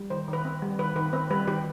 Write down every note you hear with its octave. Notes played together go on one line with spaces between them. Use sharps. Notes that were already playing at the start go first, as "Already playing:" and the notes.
Already playing: G3
D#3 C5
D#3
B4
C4
G3
D#3 B4
D#3 B4
C4 B4
G3 B4
D#3 G4